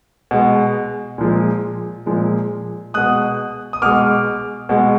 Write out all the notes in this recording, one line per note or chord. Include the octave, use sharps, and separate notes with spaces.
B2 G#3
A#2 F3 G#3
A#2 F3 G#3
B2 G#3 D#6 F#6
D#6
B2 G#3 D6 F6
B2 G#3